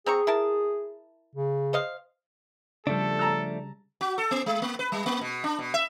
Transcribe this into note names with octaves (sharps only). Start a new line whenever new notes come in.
C4 G#4 A#5 C#6
E4 A#4 A5
C#3
C5 D#5 F5
C#3 F3 G3 A3 D4 A4
A5 A#5 E6
F#4
A4
B3
G#3
A#3
B4
G3
A#3
B2
D4
B2
E5